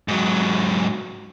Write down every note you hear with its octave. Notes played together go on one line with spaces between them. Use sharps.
G#2 F#3